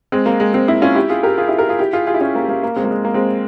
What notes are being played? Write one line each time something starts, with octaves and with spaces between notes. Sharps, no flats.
G#3 C4
A#3
G#3
G#3 C4
C4 E4
C#4 F4
E4 G4
F4 G#4
G4 A#4
F4 G#4
E4 G4
G4 A#4
F4 G#4
E4 G4
F4 G#4
F4 G#4
E4
C#4 F4
A#3
A#3
A#3
G#3 C4
A#3
G#3
A#3
G#3 C4